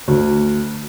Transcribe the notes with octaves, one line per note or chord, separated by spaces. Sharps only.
D2